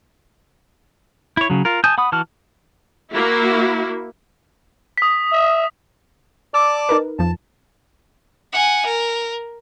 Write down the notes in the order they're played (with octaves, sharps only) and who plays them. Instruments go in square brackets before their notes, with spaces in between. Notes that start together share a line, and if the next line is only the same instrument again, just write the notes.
[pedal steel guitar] E4 C#5
C#3 F#3
F4 A#4
G#5 A5 D#6 G6
F#5 B5 D#6
E3 F#4 A5 F6
[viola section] A#3 E4 F#4
[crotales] D#6 B6
[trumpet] E5
[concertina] D5 A5 D6 [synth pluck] E6
[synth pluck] D#4 A#4 B4
[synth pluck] F2 F3 [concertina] A5
[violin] F#5 G#5
A#4